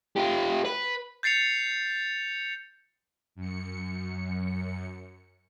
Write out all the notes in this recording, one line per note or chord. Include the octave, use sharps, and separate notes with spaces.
F4 G4
B4
G6 A6 C7 C#7 F7
F#2 C#7